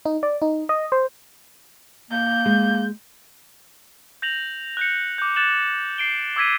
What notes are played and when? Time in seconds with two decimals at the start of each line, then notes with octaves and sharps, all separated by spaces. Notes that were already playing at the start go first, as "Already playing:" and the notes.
0.05 D#4
0.23 D5
0.42 D#4
0.69 D#5
0.92 C5
2.11 A#3 G6
2.46 G#3
4.22 G6 A#6 F7 F#7
4.77 F#6 G6 C#7
5.18 D6 G6
5.36 F#6 A6 E7 F#7
5.98 C7 D7 G7
6.36 D6 E6 G#6 B6 D#7